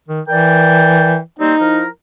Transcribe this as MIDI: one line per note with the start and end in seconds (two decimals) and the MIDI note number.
0.08 0.21 51
0.28 1.19 52
0.28 1.16 70
0.28 1.16 74
0.28 1.16 79
1.39 1.54 55
1.39 1.54 58
1.39 1.54 60
1.39 1.80 63
1.60 1.86 53
1.60 1.86 64
1.60 1.86 70